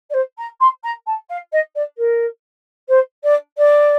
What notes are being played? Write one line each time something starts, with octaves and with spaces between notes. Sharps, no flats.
D5
C5
A#5
C6
A#5
A5
F5
D#5
D5
A#4
C5
D5
D5